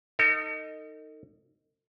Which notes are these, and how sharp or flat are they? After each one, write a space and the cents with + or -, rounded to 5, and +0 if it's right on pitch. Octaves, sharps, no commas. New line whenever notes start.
D#4 +0 A4 +45